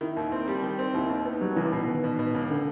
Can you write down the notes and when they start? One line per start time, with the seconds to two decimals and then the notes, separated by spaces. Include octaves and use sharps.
0.01 D#3 E4
0.17 D#2
0.32 C4
0.48 G3
0.63 D#3
0.79 C4
0.94 D#2 E4
1.10 D#2 D#4
1.26 B3
1.41 F#3 G3
1.56 C#2 E3
1.72 B2
1.87 D#3 B3
2.04 B2
2.19 B2
2.35 C#2
2.50 D3 A#3